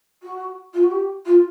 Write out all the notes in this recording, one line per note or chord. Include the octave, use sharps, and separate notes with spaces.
F#4
F4
F#4
G4
F4